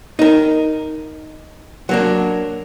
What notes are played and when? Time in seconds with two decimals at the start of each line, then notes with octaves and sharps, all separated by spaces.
0.19 D#4 A#4
1.89 F#3 A#3 D4